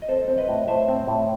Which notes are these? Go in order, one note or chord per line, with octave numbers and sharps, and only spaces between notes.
D#5
C4 A4 C5
C4
B4 D#5
A2
A2 C5 E5
C4
A2